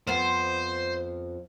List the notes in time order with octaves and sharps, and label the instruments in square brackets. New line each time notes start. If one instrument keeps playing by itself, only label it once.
[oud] F2 B3 [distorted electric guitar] C5